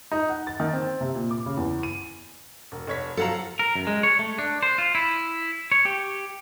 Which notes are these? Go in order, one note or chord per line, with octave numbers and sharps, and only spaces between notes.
D#4
F#5
A6
D#3
C4
C3
A#2
D6
C#3
E2
D#7
E1
F1 C#5 B6
F3 F#3 A4 F5 F#5 A#5
A#4
F#2
G#3
C#5
A3
D4
C5
F4
E4
C#5
G4